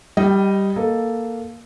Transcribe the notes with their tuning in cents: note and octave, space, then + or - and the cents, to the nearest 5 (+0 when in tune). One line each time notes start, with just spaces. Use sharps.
G3 +0 D#5 +0 G5 -30
A#3 +0 A4 +0